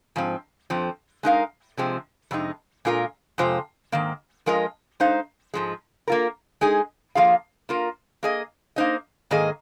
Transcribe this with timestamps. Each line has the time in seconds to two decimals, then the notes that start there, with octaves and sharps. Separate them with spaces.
0.16 G#2 F3 C4
0.70 F2 F3 C4
1.23 G#3 D#4 A#4 F5
1.77 C3 F3 G#3 C4
2.31 F2 C3 G#3 D#4
2.85 A#2 G#3 F4 A#4
3.38 F2 C3 G#3 F4 C5
3.92 G#2 D#3 A#3
4.46 F3 G#3 F4 A#4 D#5
5.00 G#3 D#4 C5 F5
5.54 G#2 F3 G#3
6.08 A#3 F4 A#4
6.61 G#3 D#4 G#4
7.15 F3 A#3 F4 G#4 F5
7.69 A#3 F4 A#4
8.23 A#3 G#4 D#5
8.76 A#3 D#4 C5 D#5
9.31 G#2 D#3 A#3 G#4 D#5